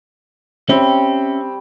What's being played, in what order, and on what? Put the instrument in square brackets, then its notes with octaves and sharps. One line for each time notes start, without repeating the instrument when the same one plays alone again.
[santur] G3 C#5 [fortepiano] C4 [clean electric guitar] C#4 E5